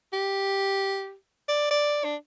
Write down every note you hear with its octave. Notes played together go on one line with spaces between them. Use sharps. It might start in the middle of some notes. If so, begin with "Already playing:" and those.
G4
D5
D5
D4